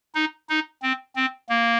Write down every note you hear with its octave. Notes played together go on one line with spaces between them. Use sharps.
D#4
D#4
C4
C4
A#3